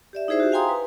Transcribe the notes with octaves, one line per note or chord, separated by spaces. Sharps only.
G4 D5 E5
D#4 E4 G#4 C5 E5
F#4 G4
F5 G5 G#5 A#5 C6 D#6
B4